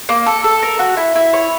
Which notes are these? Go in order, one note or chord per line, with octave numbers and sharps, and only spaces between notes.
A#3
A4
A4
A#4
F#4
E4
E4
C#5